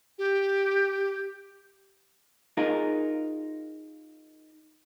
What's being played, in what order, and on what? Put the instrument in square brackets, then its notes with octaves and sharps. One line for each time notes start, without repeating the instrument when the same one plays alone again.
[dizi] G4
[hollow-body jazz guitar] D#4 F4 G#4 A#4